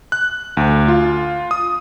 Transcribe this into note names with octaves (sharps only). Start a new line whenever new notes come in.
F#6
D2
F4
D#6